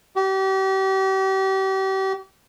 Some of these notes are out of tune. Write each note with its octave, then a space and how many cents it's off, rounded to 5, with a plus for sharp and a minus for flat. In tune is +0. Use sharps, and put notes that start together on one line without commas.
G4 -35